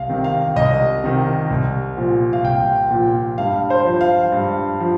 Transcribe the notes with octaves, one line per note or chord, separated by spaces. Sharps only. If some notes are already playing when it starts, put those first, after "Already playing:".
Already playing: C2 F5
C3 D#3
F5
C2 D#5
C3 D#3
C2
A#2 F3
F5
C2 G5
A#2 F3
G2 F5
C5
F3
F5
G2
F3